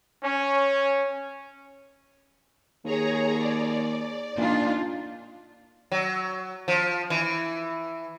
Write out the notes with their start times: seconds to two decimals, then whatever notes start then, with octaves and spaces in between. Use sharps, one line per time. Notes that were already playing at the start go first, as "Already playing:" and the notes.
0.24 C#4
2.85 D#2 G#4 C#5 A#5
3.38 D5
4.38 A#2 D4 D#4 F4
5.92 F#3
6.68 F3
7.10 E3